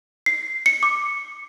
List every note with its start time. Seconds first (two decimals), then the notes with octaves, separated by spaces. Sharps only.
0.26 C7
0.66 C#7
0.83 D6